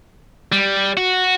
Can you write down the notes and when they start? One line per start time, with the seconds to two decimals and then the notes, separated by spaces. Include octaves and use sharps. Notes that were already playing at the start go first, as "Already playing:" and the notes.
0.52 G3
0.97 F#4